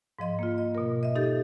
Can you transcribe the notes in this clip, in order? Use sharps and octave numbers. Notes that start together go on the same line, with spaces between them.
G#2 F3 D#5 C6
A#3 F4
D#5
B2 A#4
D#5 E5
D#4 G4 A4 E5 G6 A6